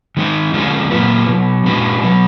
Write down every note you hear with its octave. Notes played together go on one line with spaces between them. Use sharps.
D#3 G#3 D#4
D3 G#3 D4 F4 G#4
A#2 F#3 A#3 F4 B4
B2 F#3 B3
A#2 G#3 D4 F#4 B4
B2 F#3 B3